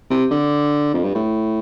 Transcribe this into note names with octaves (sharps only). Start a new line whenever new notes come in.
C3
D3
F2
G2
A2